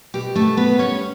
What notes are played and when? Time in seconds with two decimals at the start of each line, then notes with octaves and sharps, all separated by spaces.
0.14 B2 G4
0.35 A3 A4
0.43 B3
0.57 B3 B4
0.71 G3
0.79 C#4 C#5